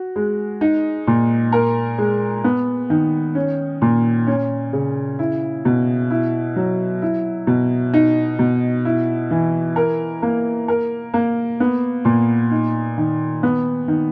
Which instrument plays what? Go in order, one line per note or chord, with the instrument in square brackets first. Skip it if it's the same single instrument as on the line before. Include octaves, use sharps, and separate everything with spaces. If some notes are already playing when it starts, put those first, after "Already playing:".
Already playing: [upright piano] F#4
G#3
D#4
A#2
A#4
G#3
B3
D#3
C#4
A#2
C#4
C#3
E4
B2
E4
F#3
E4
B2
D#4
B2
E4
E3
A#4
A#3
A#4
A#3
B3
A#2
D#4
D#3
B3
D#3